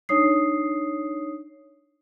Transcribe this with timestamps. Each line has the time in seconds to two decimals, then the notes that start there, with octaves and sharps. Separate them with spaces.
0.09 D4 D#4 C#5 D#6 C7